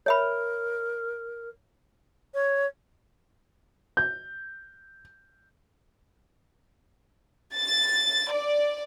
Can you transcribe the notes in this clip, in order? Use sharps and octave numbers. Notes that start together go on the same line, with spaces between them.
A#4 C#5 E5 B5
C#5
G6
A6
D5